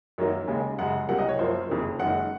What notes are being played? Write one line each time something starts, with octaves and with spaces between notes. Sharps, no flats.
F#2 D#3 F#3 A#3 C#5
D#2 C#3 G#3
F#2 C#3 G#3 F#5
C2 C3 F#3 A#3 F#5
D#5
C#5
F#2 F3 A#3 C5
F#1 F2 C3 D#3
F#1 F#2 D#3 G#3 F#5